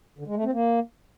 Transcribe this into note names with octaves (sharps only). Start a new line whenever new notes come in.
D3
G#3
A3
C4
A#3